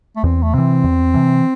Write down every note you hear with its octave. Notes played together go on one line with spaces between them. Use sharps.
A3
E2 C4
A3
C3 E3 C4
E2
C3 E3